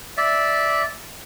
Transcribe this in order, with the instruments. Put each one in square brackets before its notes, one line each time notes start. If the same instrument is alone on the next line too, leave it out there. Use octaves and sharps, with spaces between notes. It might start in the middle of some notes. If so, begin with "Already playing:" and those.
[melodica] D5 E5